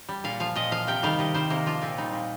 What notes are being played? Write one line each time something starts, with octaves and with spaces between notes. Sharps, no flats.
G3
A#2 F5
F3 F5
A#2 D#5
F3 F5
C3 G5
D#3 G3 F5
C3 D#5
D#3 G3 C5
C3 A#3
F3 F4
A#2 C4
G3 D#4
A#2